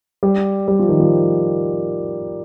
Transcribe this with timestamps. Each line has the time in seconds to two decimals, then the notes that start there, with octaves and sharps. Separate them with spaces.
0.23 G3
0.68 G3
0.79 F3
0.89 D#3
1.00 F3